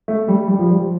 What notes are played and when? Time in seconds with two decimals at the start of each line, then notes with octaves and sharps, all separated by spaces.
0.08 A3
0.28 G3
0.48 G3
0.59 F3
0.70 G3